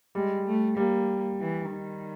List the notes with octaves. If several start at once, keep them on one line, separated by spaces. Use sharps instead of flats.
G3 G#3
A3
G3 A#3
E3
D#3